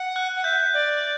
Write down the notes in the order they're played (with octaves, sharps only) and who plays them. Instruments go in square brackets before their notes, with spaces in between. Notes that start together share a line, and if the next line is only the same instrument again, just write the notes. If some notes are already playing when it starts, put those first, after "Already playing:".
Already playing: [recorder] F#5
[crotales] F#6
[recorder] F#5
[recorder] E5 [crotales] G6
[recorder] D5